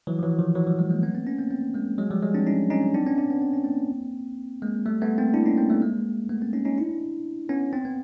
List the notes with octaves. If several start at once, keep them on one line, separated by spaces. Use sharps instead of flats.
E3 F#3
F3
E3 F#3
D#3 F3
E3 F#3
F3 G3
F#3 G#3
G#3 A#3
A3 B3
A#3 C4
B3 C#4
A#3 C4
A#3 C4
G#3 A#3
F#3 G#3
F3 G3
F#3 G#3
C4 D4
C#4 D#4
C#4 D#4
C4 D4
B3 C#4
C4 D4
B3 C#4
C4
C#4
A#3 C4
G#3 A#3
G3 A3
A3 B3
A#3 C4
D4 E4
C#4 D#4
A#3 C4
G3 A3
G#3 A#3
A3 B3
A#3 C4
C#4 D#4
C#4 D#4
D4 E4
B3 C#4
C4
B3